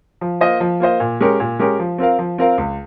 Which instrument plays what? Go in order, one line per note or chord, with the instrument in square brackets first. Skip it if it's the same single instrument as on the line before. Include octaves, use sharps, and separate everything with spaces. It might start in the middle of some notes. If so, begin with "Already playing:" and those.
[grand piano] F3
A#3 F4 C5 D#5
F3
A#3 F4 C5 D#5
A#2
G#3 C#4 G4 A#4
A#2
G#3 C#4 G4 A#4
F3
C4 F4 A#4 F5
F3
C4 F4 A#4 F5
C#2